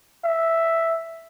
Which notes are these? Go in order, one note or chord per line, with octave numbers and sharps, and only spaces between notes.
E5